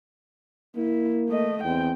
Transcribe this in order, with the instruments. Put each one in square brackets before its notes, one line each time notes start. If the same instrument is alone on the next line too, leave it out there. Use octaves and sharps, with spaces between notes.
[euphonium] A#3 [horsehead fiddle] E4
[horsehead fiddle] A3 D#5
[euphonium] E2 [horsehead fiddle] C4 G5